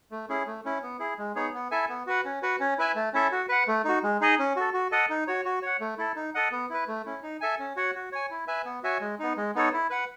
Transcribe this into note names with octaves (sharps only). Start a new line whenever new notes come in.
A3
C#4 E4 G#4
A3
C#4 E4
B3
E4 G#4
G#3
B3 D#4 G#4 C#5
B3
E4 A4 E5 G#5
B3
F#4 B4 F#5
C#4
F#4 B4 F#5
C#4
E4 B4 E5 G#5
A3
C#4 E4 A4 E5
F#4
B4 F#5
A3
D#4 F#4
G#3
D#4 G#4 D#5
C#4
F#4 A4
F#4
A4 D#5 F#5
D#4
F#4 C#5
F#4
C#5 F#5
A3
E4 A4
D#4
A4 D#5 F#5
B3
E4 B4
A3
C#4 E4
D#4
A4 E5 G#5
C#4
F#4 C#5 F#5
F#4
C#5 G#5
E4
B4 E5 G#5
B3
F#4 C#5 E5 G#5
G#3
B3 D#4
G#3
B3 D#4 A4 C#5
E4
B4 F#5